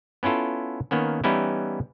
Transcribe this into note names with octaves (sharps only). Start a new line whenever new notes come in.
B3 C#4 E4 F4 A4
D#3 A#3 B3 C#4
E3 G3 B3 C#4 D#4 E4